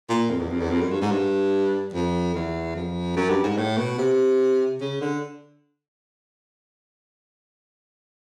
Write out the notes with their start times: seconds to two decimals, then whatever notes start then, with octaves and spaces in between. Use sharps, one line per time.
0.09 A#2
0.30 F2
0.40 E2
0.50 F2
0.60 E2
0.70 F2
0.81 F#2
0.91 G2
1.01 G#2
1.11 G2
1.94 F2
2.35 E2
2.76 F2
3.16 F#2
3.30 G2
3.44 G#2
3.57 A2
3.78 B2
3.98 C3
4.81 C#3
5.01 D3